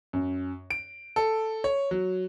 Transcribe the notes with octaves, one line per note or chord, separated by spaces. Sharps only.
F#2
D7
A4
C#5
F#3